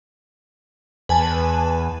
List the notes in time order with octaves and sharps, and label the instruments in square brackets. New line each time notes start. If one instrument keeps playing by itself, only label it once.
[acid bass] E2 [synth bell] B4 G#5 A5